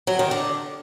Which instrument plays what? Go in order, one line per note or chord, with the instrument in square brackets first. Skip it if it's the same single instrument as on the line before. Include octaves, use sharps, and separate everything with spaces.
[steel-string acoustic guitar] F#3
D#3
D3